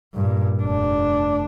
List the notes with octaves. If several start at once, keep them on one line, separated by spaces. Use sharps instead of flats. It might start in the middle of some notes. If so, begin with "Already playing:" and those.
G2 A#2
F1 D4